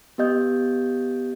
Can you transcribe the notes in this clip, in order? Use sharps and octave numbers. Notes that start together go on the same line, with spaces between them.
B3 G4 D#5 G6